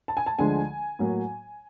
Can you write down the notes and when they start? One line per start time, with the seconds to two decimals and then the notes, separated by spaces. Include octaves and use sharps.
0.08 A5
0.17 G#5
0.26 A5
0.39 D2 D3 F3 G#3 G#5
0.99 A2 F#3 A#3